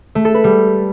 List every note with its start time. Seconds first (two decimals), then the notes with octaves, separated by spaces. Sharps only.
0.15 A3
0.25 A4
0.34 B4
0.44 G3